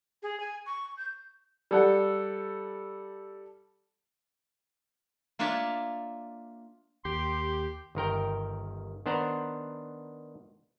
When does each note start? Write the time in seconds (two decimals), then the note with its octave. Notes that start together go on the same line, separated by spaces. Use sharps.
0.23 G#4
0.40 G#5
0.66 C#6
0.98 G6
1.71 G3 A4 F#5
5.39 A#3 D4 F4 C#5 E5 A5
7.05 D#2 G4 C6
7.95 G1 D#3 A#4 G5
9.06 D#3 B3 D4 C5 F#5 A#5